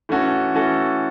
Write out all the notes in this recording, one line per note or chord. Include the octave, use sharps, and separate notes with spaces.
E3 A3 C#4 F#4 A4
E3 A3 C#4 F#4 A4